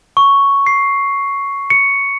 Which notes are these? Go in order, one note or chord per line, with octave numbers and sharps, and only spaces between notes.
C#6
C7
C#7